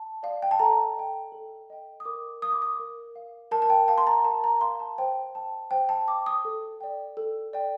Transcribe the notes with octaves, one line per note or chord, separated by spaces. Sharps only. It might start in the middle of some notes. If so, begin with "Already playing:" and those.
Already playing: A5
D5 F5
G5
A5
A4 A#5
D#5 G5
A4
D#5 G5
D#6
A#4 D6
F5 D#6
D6
D#6
A#4
F5
A#4 A5
A5
G5
F5 A5
C6
A#5
A#4 A5
A#5
F5 C6
A5
C5 G5
G5 A5
C5 G5
A5
G5 D6
D#6
A4
D5 G5
A4
D5 G5